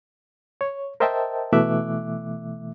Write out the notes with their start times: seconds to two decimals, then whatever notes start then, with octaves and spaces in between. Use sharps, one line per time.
0.61 C#5
1.00 A#4 C5 D#5 E5 G5 A5
1.53 B2 E3 A3 E5 D6 F#6